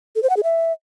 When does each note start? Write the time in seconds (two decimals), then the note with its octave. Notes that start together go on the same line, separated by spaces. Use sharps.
0.16 A4
0.23 C5
0.30 F#5
0.37 G#4
0.44 E5